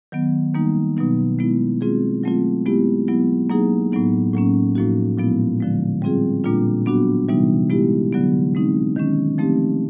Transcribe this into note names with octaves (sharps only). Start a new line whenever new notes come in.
D#3 F#3 B3
D#3 G3 A#3 D#4
B2 F#3 B3 D#4
G#3 B3 E4
G#3 C4 F4 G#4
F#3 A3 C4 F4
G#3 B3 E4 G4
F#3 B3 E4
F#3 A#3 D#4 G#4
A2 F#3 B3 D#4
A2 F#3 A#3 C#4
A2 F3 A#3 D#4 F#4
A#2 F3 G#3 B3 E4
D3 F3 G#3
G3 C4 F4 G#4
A#2 G3 A#3 D4 F4
F#3 B3 D4 F#4
C3 E3 G3 B3 D#4
G#3 B3 E4 G4
D3 F#3 B3
G#3 C4 D#4
D#3 G#3 C#4
F3 A3 C4 D#4 G4